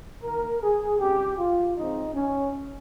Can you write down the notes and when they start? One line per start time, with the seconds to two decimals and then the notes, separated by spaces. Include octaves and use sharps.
0.23 D#2 D#3 A#3 A#4
0.62 G#4
1.00 C#2 C#3 G3 C4 G4
1.38 F4
1.76 C#2 C#3 F3 G#3 C4 D#4
2.14 C#4